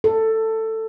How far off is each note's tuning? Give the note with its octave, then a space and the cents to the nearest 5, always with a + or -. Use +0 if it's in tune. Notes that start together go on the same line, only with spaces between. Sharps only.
A4 +15